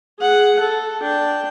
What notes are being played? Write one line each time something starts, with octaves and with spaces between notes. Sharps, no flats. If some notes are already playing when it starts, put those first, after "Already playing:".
G#4 F#5
A4
D4 G5